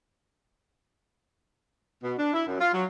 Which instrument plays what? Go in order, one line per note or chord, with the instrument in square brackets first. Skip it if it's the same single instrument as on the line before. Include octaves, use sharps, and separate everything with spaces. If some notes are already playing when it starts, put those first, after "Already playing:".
[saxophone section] B2
D4
E4
F#2
F4
F#3